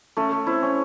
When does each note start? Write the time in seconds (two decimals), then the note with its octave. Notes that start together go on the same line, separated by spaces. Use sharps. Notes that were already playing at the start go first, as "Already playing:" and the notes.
0.17 A3 C#4
0.32 A3
0.47 C4 E4
0.62 C#4